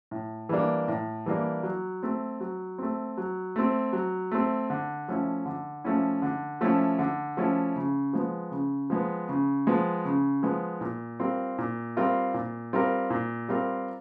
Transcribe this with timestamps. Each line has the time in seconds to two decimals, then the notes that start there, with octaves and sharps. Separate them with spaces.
0.11 A2
0.49 E3 G3 A#3 D4
0.88 A2
1.26 E3 G3 A#3 D4
1.63 F#3
2.03 A3 C4
2.40 F#3
2.78 A3 C4
3.18 F#3
3.56 A3 C4
3.93 F#3
4.32 A3 C4
4.70 D3
5.08 F3 A3 C#4 E4
5.46 D3
5.84 F3 A3 C#4 E4
6.22 D3
6.61 F3 A3 C#4 E4
6.99 D3
7.37 F3 A3 C#4 E4
7.76 C#3
8.13 F3 G#3 B3
8.52 C#3
8.90 F3 G#3 B3
9.29 C#3
9.67 F3 G#3 B3
10.05 C#3
10.43 F3 G#3 B3
10.81 A#2
11.20 G3 C4 F4 A#4
11.58 A#2
11.97 G3 C4 F4 A#4
12.34 A#2
12.73 G3 C4 F4 A#4
13.10 A#2
13.49 G3 C4 F4 A#4